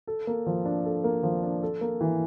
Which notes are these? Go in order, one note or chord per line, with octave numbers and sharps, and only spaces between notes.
A4
A#3
F3
D4
A4
A#3
F3
D4
A4
A#3
E3